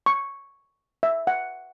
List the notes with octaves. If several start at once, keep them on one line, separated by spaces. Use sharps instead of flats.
C#6
E5
F#5